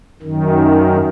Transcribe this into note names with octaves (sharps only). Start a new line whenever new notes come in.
F#2 D#3